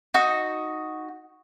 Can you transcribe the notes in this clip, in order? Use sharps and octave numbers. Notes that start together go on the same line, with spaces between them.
D#4 F#4